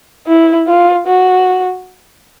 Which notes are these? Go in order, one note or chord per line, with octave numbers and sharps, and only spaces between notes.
E4
F4
F#4